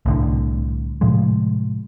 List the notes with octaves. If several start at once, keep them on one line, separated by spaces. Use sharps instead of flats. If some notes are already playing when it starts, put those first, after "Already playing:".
C2 A2 D3
A2 C3 F3 G#3